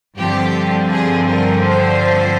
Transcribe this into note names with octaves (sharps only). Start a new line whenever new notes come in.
G2 D3 F3 C4 G4
G#4
A#4
C5